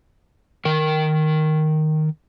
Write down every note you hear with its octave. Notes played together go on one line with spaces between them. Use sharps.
D#3 A#4